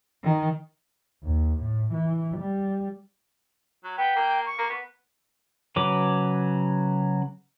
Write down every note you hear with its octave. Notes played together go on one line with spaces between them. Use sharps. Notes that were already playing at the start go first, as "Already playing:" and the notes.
D#3
D#2
A2
E3
G3
F#3
B3 G5
A#3
C#6
A#3
B3
C#3 F#3 B4 D6